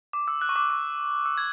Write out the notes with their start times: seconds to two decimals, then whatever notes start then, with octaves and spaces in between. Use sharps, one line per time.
0.13 D6
0.28 E6
0.41 F#6
0.49 C#6
0.56 D6
0.70 C#6
1.26 E6
1.38 G#6